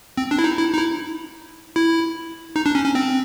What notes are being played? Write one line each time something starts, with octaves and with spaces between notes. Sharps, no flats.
C4
D4
E4
D#4
E4
D#4
E4
E4
D#4
D4
C#4
C#4
C4